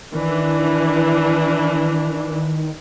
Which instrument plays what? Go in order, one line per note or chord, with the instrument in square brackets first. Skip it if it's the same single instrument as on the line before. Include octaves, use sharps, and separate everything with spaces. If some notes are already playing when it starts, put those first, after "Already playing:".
[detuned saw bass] D#3 [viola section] E3 D4